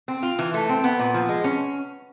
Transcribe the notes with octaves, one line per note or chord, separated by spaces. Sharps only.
C4
F4
E3
A3
C4
B3
A#2
F3
G#3
C#4